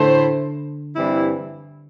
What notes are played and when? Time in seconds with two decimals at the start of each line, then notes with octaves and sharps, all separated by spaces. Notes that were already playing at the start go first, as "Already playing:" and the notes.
Already playing: A2 D3 A3 E4 C5
0.96 G2 E3 G3 C4 E4